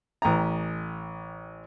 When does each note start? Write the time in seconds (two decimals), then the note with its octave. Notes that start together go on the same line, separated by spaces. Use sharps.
0.22 A1 G5 A#5